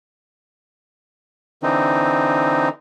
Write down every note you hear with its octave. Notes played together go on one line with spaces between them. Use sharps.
D3 E3 C4 D#4